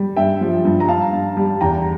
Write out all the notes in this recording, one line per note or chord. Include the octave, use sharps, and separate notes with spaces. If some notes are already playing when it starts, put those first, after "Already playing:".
Already playing: G3
G2 E5 G5
F3
G2
A#5
G2 F5 A5
G2
G3
E2 G5 A#5